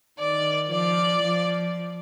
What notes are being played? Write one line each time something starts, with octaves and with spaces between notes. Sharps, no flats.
D#3 D5
F3 D5
F3